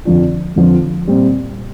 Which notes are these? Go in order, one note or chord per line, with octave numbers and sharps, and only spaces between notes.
F2 D3 F3 D4 F4
F2 D3 F3 D4 F4
A#2 G3 C4